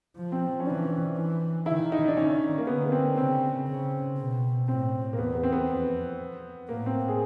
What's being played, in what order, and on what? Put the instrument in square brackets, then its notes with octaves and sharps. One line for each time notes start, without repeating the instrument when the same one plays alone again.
[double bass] F3
[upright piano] C4
C#4
[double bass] E3 [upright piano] D4
[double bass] E3
[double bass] D#3 [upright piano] E4
[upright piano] D#4
D4
[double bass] D#3 [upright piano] C#4
[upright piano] A#3
[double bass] D3 [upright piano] B3
[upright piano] B3
C4
[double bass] C#3 [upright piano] C4
[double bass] C#3
B2
[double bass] A2 [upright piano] C4
[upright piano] A#3
[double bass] E2 [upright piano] B3
[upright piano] B3
C4
B3
[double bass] F2
[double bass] A2 [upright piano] A#3
[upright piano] C4
G#4